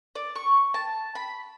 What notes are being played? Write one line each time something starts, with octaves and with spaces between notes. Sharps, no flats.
D5
C#6
A5
B5